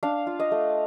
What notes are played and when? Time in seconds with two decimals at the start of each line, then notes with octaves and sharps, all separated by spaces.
0.03 D4 F5
0.27 F4
0.40 D#5
0.51 A3